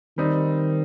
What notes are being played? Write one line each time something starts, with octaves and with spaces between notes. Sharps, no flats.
D#3 G3 C4 D#4